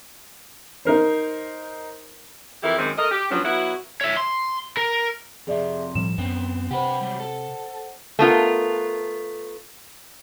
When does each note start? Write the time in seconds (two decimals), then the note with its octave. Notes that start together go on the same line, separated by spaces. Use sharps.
0.85 D#4 A#4 C5
2.63 F2 E3 E4 G4 A#4
2.78 F#2 D#3 G#3 C4
2.98 A3 A#4 D#5
3.11 G4
3.31 F3 F#3 B3 C#4 D4
3.45 F#3 B3 E4 F#4
4.01 C#5 E5
4.17 C6
4.77 A#4
5.47 F2 C3 G#4 D5 E5
5.95 A2 F3 G3 E7
6.18 F#2 B3 C4
6.71 C3 G4 B4 C5 F#5
7.01 F#3 G3
7.20 A4
8.19 A3 B3 F4 A#4